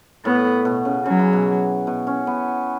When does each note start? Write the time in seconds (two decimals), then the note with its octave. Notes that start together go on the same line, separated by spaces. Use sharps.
0.25 A2 B3
0.65 B2
0.85 C#3
1.06 C#3 F#3
1.19 E3
1.33 B2
1.87 B2
2.07 C#4
2.27 B3